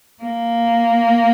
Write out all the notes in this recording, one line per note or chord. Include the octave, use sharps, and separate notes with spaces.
A#3